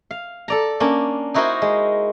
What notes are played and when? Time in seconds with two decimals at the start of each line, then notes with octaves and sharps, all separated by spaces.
0.11 F5
0.48 A4 D5 A#5
0.80 A#3 C#4 D4
1.34 D#4 E4 F#4 A#4 C5 D#5
1.62 G#3